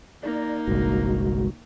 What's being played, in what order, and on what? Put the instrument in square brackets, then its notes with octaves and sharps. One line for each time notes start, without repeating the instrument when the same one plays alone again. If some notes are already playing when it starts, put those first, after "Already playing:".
[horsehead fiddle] A#3 D#4 [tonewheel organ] D5
[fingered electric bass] G1 C2 [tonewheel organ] G#3 F#4